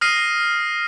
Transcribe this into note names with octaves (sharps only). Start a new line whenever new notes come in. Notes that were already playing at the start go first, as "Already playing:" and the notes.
D#6 F6 A#6 C7 D#7